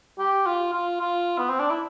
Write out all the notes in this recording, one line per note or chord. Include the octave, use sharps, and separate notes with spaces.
G4
F4
F4
F4
B3
C4
D4
E4